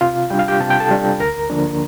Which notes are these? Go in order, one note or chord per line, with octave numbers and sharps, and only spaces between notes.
C3 F4 F5
G3 D4 G5
F5
G4 G5
C3 A5
G5
A4 A5
G3 D4
D2 A#4 A#5
D3 F3 A#3 D4